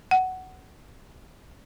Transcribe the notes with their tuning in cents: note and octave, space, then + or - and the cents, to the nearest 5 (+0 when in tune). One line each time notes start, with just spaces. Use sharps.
F#5 +10